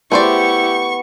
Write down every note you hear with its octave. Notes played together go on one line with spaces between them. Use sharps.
A3 B3 E4 G4 C5 D5 C#6